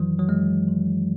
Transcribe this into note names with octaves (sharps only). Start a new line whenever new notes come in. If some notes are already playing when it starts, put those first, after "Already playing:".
Already playing: F#2 D#3 E3 F#3
F#3
F#2 G#3
D#3